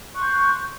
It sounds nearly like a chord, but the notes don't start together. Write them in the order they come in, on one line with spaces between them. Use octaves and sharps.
C#6 F#6 C6 G6